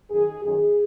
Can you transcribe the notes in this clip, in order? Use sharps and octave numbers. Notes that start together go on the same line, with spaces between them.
F#2 D#3 G#4
F#2 D#3 G#4